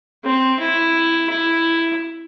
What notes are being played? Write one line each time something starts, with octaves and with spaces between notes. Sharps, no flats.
C4
E4
E4